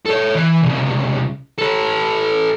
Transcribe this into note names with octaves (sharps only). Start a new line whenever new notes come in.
A4 C#5
E3
C2 C#3
A4 B4